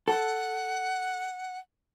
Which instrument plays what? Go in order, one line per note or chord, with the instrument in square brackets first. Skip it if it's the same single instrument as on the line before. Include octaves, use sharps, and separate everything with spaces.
[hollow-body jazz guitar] A4 [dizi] F#5